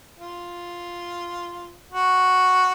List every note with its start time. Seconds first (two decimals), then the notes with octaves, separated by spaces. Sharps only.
0.19 F4
1.91 F#4